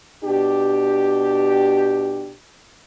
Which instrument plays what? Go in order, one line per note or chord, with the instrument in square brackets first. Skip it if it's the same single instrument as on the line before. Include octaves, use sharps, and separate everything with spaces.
[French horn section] B2 D4 G4